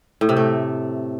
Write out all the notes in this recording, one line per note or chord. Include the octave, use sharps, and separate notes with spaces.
A2
C3
A3